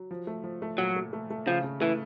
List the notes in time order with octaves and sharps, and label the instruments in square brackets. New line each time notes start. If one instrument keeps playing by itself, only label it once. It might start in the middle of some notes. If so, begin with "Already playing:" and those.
Already playing: [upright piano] F#3
F3
A3
F3
A3
[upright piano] A#2 [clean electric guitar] F#3
[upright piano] A3
A3
A3
[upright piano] C#3 [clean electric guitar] F3
[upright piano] C#3
[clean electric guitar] E3 [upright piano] A3